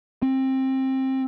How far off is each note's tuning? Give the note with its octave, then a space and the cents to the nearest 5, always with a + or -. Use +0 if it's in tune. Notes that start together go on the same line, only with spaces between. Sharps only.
C4 +20